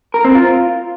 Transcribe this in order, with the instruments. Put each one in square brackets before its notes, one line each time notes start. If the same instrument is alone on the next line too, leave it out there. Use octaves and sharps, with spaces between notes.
[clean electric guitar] A#4
C4
F4